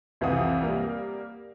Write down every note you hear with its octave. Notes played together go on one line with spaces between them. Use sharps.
C2 F2 E3 F5 F#5 D#6
G3 A#3